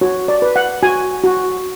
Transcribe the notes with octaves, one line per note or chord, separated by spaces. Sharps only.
F#4 C#5
D5
B4
F#5
F#4 G#5
F#4